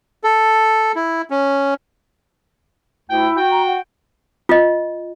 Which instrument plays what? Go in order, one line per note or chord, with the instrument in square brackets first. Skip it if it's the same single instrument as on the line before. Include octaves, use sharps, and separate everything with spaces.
[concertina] A4
E4
C#4
[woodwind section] D2 G5 [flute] E4
[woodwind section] F#4 G5
[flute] A#5
F#5
[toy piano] F4 D#5